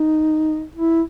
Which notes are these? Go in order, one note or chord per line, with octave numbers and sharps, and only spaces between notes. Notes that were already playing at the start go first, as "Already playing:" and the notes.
Already playing: D#4
E4